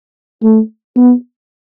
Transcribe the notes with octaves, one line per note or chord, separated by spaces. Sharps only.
A3
B3